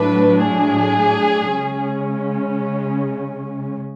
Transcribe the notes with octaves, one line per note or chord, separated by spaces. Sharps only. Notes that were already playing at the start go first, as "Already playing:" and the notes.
Already playing: A2 F#3 A3 D4 B4
G#4
C#3 G#3 C#4